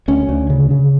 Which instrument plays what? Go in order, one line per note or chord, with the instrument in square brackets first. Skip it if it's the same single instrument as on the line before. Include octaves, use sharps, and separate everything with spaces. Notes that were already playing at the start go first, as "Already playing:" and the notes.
[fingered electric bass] D2 C#4
D2
C#3
C#3